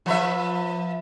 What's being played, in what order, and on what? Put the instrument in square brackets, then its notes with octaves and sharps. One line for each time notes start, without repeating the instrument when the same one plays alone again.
[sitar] F3 B4 E5